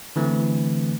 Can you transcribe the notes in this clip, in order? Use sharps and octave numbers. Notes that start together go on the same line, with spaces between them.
D3 E3 A3 C4